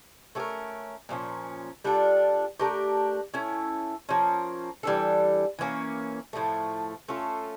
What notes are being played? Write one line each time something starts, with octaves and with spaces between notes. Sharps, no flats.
A3 C#4 G4 A#4
A#2 F3 A3 C#4
G3 D4 F4 A4
A3 D4 G4 A#4
A3 C#4 E4
F3 A#3 C#4
E3 G3 D4 A4
E3 A#3 C#4
A2 F3 A3
A3 C#4 F4 A4